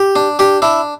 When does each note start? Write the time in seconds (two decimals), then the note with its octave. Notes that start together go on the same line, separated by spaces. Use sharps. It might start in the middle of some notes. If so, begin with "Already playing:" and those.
Already playing: G4
0.16 D4
0.39 D4 G4
0.62 D4 E4